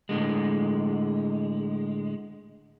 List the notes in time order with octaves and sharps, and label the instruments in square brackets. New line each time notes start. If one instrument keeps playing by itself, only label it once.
[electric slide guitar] A2 D3 G#3